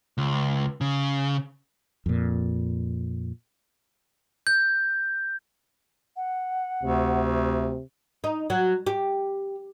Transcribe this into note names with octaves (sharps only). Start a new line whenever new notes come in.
C#2
C#3
F2 A#2
G6
F#5
D2 C3
D#4
F#3
G4